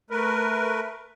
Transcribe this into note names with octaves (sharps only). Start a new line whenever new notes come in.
A3 A#4 B4